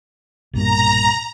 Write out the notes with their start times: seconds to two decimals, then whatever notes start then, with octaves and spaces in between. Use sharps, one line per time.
0.54 B1 G2 A#2 A#5